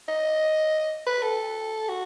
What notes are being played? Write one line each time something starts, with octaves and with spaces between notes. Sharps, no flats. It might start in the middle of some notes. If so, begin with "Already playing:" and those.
D#5
B4
A4
F#4